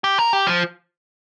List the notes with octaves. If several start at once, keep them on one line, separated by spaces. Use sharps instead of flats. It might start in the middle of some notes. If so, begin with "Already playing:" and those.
G4
A#4
G4
F3